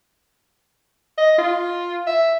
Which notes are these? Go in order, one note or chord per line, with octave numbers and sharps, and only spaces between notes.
D#5
F4
E5